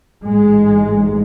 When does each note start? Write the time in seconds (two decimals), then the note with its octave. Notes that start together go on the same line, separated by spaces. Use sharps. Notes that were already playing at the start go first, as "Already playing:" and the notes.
0.23 A1 G#2 G#3